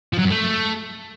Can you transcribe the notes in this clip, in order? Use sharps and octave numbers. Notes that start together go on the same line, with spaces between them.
F3
F#3
F#2
A3